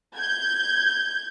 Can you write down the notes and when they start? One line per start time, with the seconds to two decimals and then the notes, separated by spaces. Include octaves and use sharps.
0.15 G6 G#6